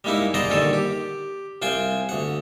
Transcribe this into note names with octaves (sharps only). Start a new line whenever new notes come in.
G3 G#3 A#3 D#4 E4
G#4 C5 D5 D#5 F#5 A#5
A#1 D3 D#3 G3 A4 D5
G4
C2 F4 C5 G5 G#5
D2 F#5